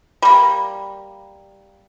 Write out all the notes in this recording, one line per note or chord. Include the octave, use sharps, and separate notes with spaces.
G3 A#3